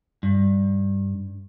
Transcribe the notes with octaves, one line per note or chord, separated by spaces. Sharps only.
G2